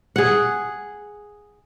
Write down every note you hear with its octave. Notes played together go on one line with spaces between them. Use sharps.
G#4 F#5